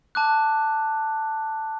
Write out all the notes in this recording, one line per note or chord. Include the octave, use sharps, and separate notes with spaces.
A5 D6 F#6